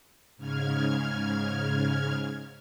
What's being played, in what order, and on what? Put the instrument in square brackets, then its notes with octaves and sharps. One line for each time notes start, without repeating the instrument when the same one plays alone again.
[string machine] G#2 C#3 F6 G#6